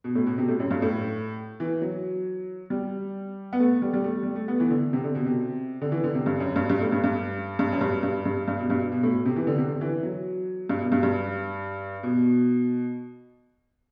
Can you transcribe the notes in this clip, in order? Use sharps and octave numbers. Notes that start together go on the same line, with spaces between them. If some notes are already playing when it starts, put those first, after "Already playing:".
B2
A2
B2
C3
A2
F#2
G2
A2
E3
F#3
G3
B3
A3
G3
G3
A3
G3
A3
B3
E3
D3
C3
D3
B2
C3
D3
E3
D3
C3
G2
F#2
G2
G2
A2
G2
G2
G2
F#2
G2
G2
G2
G2
B2
G2
B2
A2
C3
E3
D3
C3
D3
E3
F#3
G2
B2
G2
G2
B2